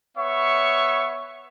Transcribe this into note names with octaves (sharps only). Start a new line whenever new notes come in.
B3 C#5 E5 C#6